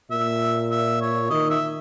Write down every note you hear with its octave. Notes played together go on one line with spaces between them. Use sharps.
A#2 E5
E5
C#5
D#3 D#5
E5